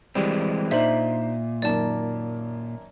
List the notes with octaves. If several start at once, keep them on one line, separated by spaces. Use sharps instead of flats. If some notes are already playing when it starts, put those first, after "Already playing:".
E3 G3 G#3 C4
A#2 D4 D#4 C5 E5 F#7
F#2 D#3 A#3 D5 A5